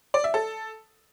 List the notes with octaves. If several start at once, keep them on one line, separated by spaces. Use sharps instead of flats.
D5
E5
A4